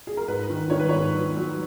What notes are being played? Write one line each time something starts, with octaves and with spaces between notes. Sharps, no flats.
G#4
A#4
G#2 B4
D#3
D#3 C#5
B4
G#2 C#5
F#3
F#3